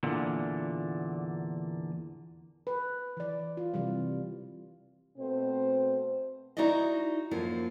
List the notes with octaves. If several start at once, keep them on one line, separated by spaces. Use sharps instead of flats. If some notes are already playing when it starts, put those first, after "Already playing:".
E2 A#2 D3
B4
E3 D5
F4
C3 E3 G3
B2 A3 C4 C5
D#4 E4 F#4 D5 D#5
F#2 F3 A#3